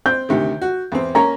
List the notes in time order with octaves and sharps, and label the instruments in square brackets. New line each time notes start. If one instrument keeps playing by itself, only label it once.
[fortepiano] C4 [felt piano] G6
[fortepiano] D2 C3 D#3
F#4
E2 C4
[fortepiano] A#3 C#4 C#5 [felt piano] A#5